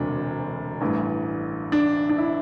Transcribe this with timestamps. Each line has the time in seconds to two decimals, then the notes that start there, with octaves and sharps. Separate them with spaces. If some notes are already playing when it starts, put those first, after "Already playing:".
Already playing: E1 D2 C3 D4
0.81 A1 G2 E3
1.72 D4
2.09 D4
2.18 E4